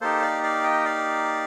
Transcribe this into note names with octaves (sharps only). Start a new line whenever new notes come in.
A#3 D#4 G4 A4 C5
D5 F5
D5 F5
D#5 G5
D5 F5